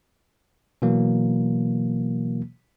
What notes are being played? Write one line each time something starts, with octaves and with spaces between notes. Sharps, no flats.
B2 E3 F#3 A#3